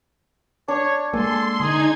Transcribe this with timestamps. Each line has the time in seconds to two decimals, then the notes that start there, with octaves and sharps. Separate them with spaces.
0.68 D4 C#5
1.13 G#3 A#3 A4 G#5 C6
1.60 D3 D#4 G#4 G#6